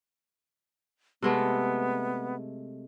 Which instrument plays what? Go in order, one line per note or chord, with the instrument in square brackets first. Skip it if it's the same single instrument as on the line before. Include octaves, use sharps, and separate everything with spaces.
[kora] C3 G#3 A3 [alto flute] B3